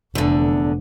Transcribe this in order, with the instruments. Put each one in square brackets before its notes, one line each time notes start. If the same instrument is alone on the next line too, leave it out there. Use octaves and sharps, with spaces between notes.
[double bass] F1 [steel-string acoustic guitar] E2 D3